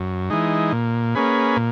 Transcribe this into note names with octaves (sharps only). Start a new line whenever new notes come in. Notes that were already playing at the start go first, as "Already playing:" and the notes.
Already playing: F#2
E3 G#3 D#4
A#2
A#3 C#4 G#4 B4
A#2